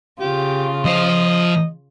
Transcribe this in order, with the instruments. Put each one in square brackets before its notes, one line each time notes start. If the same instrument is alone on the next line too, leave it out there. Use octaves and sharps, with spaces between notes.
[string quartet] C#3 F4 [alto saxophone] G4
[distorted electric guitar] F3 C5 [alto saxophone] D#5